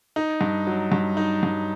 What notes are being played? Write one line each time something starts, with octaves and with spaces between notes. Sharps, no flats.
D#4
G2
F#3
G2
D#4
G2